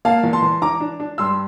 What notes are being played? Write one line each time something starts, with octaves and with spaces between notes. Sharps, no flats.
A#3 F5 A5
E2
A5 C6
E2
E3 A#5 D6
D4
D4
G2 C6 E6